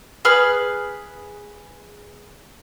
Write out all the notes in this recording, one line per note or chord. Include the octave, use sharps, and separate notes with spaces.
G#4 B4 F6